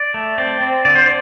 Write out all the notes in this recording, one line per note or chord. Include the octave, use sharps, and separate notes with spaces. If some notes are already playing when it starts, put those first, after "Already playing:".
Already playing: D5
A3
C4 D5
C4
D3 D5
C5
D5